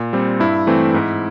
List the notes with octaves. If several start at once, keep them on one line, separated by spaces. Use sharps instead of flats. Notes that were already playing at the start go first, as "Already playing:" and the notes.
Already playing: A#2
G3 C4
G2 E4
E3 A3 C4
G#2